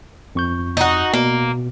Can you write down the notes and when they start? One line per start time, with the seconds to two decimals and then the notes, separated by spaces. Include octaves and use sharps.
0.35 F2 C#6 G6
0.77 D#4 F#4
1.13 B2 A#3